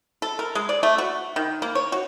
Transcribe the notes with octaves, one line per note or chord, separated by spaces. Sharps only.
A4
A#4
G#3
D5
A3
F#4
D#3
A#3
C#5
F#4